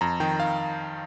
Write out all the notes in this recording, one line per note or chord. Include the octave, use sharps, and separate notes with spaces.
F2 A#5
D#3 G5
F5